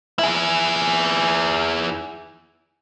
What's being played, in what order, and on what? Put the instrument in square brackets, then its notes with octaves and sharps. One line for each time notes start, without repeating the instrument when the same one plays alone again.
[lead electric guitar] E4 G#4